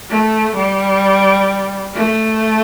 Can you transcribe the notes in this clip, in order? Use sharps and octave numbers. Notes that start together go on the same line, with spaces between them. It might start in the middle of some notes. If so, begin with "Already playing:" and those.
A3
G3
A3